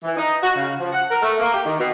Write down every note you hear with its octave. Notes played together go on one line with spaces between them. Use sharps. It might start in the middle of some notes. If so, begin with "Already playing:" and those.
E3
D#4
F#4
C#3
F3
F#5
A#4
A3
A#3
G4
D#3
B2